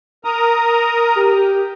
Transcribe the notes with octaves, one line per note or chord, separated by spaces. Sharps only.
A#4 A#5 D#6
G4